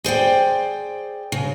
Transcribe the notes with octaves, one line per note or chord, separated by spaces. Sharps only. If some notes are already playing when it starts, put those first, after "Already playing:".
G#4 C5 D5 G5
C#3